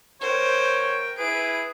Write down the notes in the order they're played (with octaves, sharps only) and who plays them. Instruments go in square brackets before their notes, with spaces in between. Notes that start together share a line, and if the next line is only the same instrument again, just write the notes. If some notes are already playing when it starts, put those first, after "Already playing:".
[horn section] F#2 A#4 G5 [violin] C5 [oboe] C#5
[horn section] E4 B4 [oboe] G#4 [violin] D7